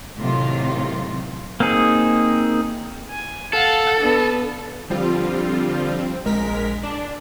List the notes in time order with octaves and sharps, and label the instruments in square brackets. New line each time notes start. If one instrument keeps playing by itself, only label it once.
[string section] A2 C3 D#3 F#3 F4
[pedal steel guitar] A#3 C4 D#4 G#4
[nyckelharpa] G#5
[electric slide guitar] A4 [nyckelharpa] F5 F#5
[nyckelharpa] B3 D4
[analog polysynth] D3 F3 G3 C4 F4
C4
A#1 G#3 A#4 B6
D4